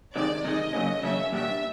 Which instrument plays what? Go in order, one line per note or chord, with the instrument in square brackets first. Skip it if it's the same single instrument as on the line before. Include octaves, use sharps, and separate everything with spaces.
[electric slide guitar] C3 D#3 G#3 [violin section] D5
[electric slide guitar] C3 D#3 G#3 [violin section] D#5
[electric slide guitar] C#3 F#3 A#3 C#4
[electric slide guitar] C#3 F#3 A#3 C#4 [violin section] E5
[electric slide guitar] B2 G3 A#3 D4 G4 [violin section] E5